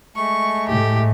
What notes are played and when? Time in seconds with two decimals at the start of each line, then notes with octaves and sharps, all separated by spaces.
0.16 G#3 A3 C#6
0.69 A2 G4